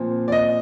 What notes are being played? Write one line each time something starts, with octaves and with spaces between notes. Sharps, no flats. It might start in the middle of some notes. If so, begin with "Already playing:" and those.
Already playing: A#2 F3 C4
D5
D#5